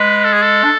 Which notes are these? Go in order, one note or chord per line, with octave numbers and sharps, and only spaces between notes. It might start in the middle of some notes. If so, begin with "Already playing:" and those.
Already playing: G#3 B4
A4
G#4
A4
D4